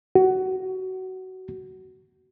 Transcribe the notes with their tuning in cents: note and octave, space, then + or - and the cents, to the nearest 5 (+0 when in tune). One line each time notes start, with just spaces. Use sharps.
F#4 +20